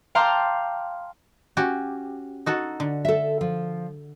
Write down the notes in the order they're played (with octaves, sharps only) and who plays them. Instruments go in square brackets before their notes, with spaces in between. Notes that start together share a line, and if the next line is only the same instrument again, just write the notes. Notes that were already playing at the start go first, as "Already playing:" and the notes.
[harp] F5 G5 A5 A#5 C6 D6
[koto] C#4 F#4 G4
D#4 F#4 A4
D3
[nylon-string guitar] A4 E5
F3